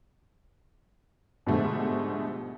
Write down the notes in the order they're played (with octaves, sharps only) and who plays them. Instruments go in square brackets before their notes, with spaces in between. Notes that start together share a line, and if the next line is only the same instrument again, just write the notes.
[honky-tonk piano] G#2 B2 D3 F3 G3 A3